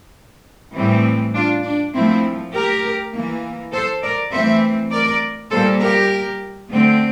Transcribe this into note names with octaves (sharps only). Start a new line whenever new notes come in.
A2 E3 G3 C4
D4 F4
D4
A#2 F3 A3 C4 E4
G4 A#4
E3 A#3
A4 C5
A#4 D5
E3 A3 C4 C5 E5
A#4 D5
A#2 G3 A#3 A4 C5
G4 A#4
D3 A3 C4